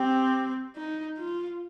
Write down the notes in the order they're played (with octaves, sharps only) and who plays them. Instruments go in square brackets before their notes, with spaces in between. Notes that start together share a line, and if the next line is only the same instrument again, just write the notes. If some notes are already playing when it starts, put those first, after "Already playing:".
Already playing: [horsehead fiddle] C4 [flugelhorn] G4
[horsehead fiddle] D#4
F4